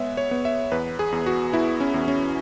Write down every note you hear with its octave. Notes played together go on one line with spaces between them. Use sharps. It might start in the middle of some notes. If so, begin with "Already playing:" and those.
Already playing: G#3 B3 C#5 E5
C#5
B3
E5
E2 B4
G#4
E2
F#4
B3 E4
C#4
E2
C#4